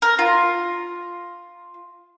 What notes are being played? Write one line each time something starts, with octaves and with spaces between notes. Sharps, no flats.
A#4
F4